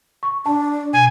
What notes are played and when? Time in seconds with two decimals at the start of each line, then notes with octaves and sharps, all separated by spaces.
0.23 C#6
0.46 D4 A5
0.93 B2 G#5